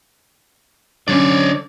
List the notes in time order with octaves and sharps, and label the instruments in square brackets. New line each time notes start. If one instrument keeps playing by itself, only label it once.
[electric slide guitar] D3 [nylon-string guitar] F#3 C#4 [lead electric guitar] C#5 D5